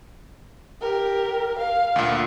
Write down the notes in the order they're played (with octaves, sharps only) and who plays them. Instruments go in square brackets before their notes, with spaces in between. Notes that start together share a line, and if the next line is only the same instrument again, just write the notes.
[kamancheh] G4 A#4
F5
[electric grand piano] D2 A#2